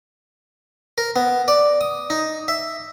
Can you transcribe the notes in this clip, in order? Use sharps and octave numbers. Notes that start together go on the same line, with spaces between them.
A#4
B3
D5
D#6
D#4
E5